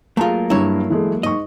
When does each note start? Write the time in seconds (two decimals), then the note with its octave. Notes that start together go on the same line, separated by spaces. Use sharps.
0.17 F#3 A3 A#3 F4 G#4 A5 A#5
0.50 G2 G3 E4 C#5 A#5
0.90 E3 G#3 A3
1.23 G#2 D#5 C#6